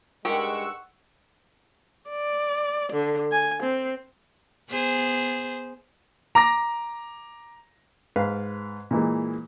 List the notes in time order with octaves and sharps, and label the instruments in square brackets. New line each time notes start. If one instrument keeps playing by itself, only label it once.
[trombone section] G2 G#3 [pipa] D#3 [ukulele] G4 [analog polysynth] F#5 C#6 E6
[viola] D5
D3
G#5
C4
[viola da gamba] B3 G#4 C5
[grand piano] A#5 D6 A#6
[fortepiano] G#2 B4 F5
A#2 E3 G#3